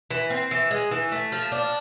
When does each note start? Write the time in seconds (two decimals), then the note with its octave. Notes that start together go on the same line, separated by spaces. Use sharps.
0.11 E3
0.30 C4
0.51 E3
0.71 G#3
0.91 E3
1.12 A3
1.32 F3
1.52 D4